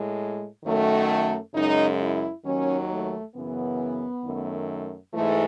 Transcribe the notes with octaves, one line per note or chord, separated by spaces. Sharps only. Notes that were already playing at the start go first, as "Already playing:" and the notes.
Already playing: A2 G#3
F#2 D#3 F#3 A3
F#2 C#3 G#3 D#4
E4
D#2 D#3 F#3 C#4
A3
F#2 C#3 E3 B3
F#2 D#3 A3
G#2 E3 G#3 A3